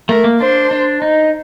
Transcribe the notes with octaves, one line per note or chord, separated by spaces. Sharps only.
A3 A#4
A#3
D4 C5
D4
D#4